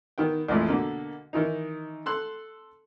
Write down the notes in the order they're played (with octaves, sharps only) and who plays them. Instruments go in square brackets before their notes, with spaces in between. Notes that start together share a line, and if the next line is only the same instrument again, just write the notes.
[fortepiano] D#3 B3 G5
A#1 F2 E3 F3 G#3 A3
B2 D3 A#3
D#3 E3 D#4
A4 C6 F#6